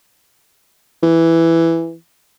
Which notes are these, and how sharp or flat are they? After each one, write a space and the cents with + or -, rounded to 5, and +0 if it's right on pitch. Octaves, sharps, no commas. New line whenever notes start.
E3 +5